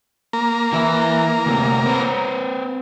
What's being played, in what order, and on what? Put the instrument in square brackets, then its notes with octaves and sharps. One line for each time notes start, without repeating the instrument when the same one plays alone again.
[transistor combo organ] A#3 A#5
[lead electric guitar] E3 E4
D2 C3
C4 B4